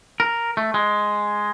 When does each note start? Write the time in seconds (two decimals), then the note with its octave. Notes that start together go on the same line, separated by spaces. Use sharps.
0.20 A#4
0.57 A3
0.74 G#3